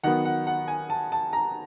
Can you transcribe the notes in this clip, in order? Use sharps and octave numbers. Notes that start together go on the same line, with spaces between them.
D#3 F#3 B3 F#5
F#5
F#5
G#5
A5
A5
A#5